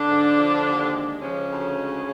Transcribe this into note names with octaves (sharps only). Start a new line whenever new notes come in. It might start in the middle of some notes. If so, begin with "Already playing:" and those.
Already playing: D3 D4
G#2
F3
D#2
G#3
C#3 F3 C#4
D2
G#3